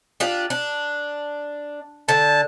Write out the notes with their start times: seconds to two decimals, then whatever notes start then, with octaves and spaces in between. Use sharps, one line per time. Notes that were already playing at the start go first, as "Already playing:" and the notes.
0.20 D4 F4 G4
0.50 D4
2.08 D3 A5